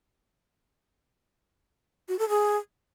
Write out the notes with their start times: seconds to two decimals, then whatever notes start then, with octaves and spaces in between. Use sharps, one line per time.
2.08 F#4
2.19 A4
2.29 G#4